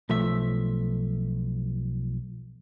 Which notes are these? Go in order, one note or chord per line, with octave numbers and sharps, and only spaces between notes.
B1 F3 A3 E5